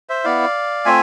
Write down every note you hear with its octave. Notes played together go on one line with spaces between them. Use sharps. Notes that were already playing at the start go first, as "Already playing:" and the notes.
C5 E5
B3 E4 D5 F5
A3 C4 F4 E5 G#5